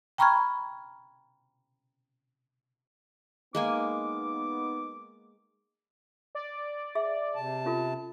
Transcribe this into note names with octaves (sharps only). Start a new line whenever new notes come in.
G5 A#5 B5 C#6 F6 G#6
G#3 A#3 B3 D#4 G#5 D6
D5
G#4 E5
C3 A5
C#4 F4 A4